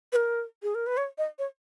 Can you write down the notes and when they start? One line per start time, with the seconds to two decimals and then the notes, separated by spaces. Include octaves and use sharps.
0.13 B4
0.16 A#4
0.63 G#4
0.75 A#4
0.87 B4
0.97 C#5
1.18 D#5
1.39 C#5